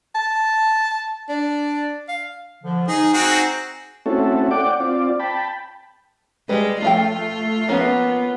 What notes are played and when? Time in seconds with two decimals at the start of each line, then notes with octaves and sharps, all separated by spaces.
0.15 A5
1.29 D4
2.08 F5
2.64 D3 F3
2.88 D#4 G#4
3.14 C4 D#4 F#4 G#4 A#5
4.06 A3 C4 C#4 E4 F#4 A4
4.51 D5 F#5 G5 D6
4.80 C4 F4 D5
5.20 G5 A5 B5
6.49 G3 G#3 B4
6.82 F3 A3 F4 F5 G5
7.68 F3 A#3 B3 C#4